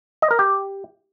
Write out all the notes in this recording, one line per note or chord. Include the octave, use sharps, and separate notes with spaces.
D#5
A#4
G4